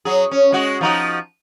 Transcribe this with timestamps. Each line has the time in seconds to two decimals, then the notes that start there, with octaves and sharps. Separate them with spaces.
0.05 F#3 G#4
0.31 C#4
0.52 G#3 F#4
0.81 F3 D#4 F#4